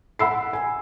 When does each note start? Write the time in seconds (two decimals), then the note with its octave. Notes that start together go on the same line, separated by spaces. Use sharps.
0.19 F#5 B5 E6 C7
0.53 G#5